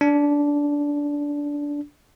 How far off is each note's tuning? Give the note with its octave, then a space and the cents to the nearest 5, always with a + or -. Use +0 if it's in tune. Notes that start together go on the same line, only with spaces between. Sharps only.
D4 -15